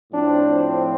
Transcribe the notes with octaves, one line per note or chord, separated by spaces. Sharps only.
A2 F3 C4 D4